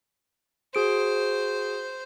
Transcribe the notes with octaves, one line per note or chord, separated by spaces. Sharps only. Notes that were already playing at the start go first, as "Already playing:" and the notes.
F#4 G#4 C5 D7